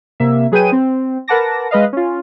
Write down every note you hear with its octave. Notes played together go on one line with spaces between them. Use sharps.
C3 A#3 E5
F#3 G#4 B4 G5 D#7
C4
A#4 B4 F#5 A5 D6 A#6
G#3 B4 D#5 F5
C#4 F4